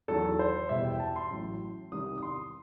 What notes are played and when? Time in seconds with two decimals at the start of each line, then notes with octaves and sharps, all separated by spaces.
0.08 E2 D#3 F#3 A4
0.39 C5
0.69 E2 B2 G3 E5
0.85 G5
1.00 A5
1.16 C6
1.31 A1 A2 F#3
1.92 C2 C3 D#3 D#6
2.18 D#6
2.22 C6